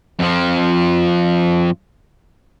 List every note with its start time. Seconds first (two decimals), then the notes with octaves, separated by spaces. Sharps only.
0.19 F2 F3